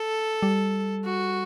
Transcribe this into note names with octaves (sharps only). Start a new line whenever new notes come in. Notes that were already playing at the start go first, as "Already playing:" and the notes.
Already playing: A4
G3
F#4